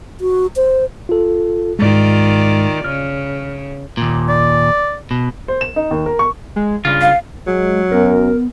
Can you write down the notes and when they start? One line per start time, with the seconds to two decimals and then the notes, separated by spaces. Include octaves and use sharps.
0.21 F#4
0.56 C5
1.09 F4 A4
1.79 G#2 D#3 G#3 F4 D5
2.84 C#3 F6
3.97 D#2 A#2
4.29 D5
5.11 B2
5.48 C5
5.61 E7
5.76 D#4
5.91 D#2
6.06 A#4
6.19 C#6
6.56 G#3
6.85 G2 C#3 F4
7.01 F5
7.47 F#3 G#3
7.92 F#2 B3 A#4